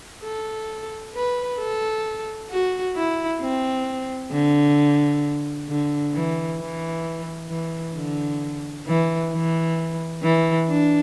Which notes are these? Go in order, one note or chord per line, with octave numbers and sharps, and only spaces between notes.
A4
B4
A4
F#4
E4
C4
D3
D3
E3
E3
E3
D3
E3
E3
E3
D4